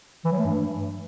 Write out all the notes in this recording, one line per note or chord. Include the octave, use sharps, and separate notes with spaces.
E3
F#3
A3
G2